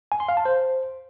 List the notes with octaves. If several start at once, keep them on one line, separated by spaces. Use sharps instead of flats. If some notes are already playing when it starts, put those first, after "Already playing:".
G#5
C6
F5
A5
C5